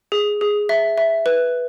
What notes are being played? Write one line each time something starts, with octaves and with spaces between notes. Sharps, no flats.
G#4
G#4
E5
E5
B4